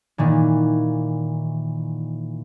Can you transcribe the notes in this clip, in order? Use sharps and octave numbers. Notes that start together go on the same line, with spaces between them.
A#2 D#3 E3